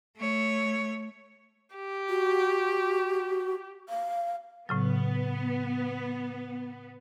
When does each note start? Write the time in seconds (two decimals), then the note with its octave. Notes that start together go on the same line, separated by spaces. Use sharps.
0.17 A3 C#5
1.76 G4
2.09 F#4
3.89 F5
4.69 A2 C#3 F#3 B3